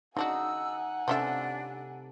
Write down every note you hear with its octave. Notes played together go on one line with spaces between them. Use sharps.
C#3 D4 D#4 F#4 F#5 G#5 E6
C3 F3 C#4 D4 A4 E5